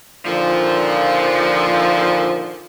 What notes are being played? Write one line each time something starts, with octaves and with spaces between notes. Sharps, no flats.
A#2 D3 D#3 F3